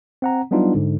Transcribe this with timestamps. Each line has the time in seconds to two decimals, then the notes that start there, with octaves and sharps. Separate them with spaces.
0.22 C4 F#5 A#5
0.51 F#3 G3 B3 D4 D#4 F4
0.75 G#2 D3